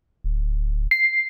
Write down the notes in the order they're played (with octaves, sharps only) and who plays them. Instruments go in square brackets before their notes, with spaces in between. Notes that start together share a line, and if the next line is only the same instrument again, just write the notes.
[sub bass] D1
[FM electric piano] C7